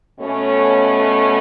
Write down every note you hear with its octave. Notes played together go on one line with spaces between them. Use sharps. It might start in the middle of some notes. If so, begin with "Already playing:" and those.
B2 A3 C#4